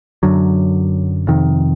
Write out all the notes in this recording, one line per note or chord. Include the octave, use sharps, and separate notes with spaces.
F#2 D3 F#3
F2 C3 D#3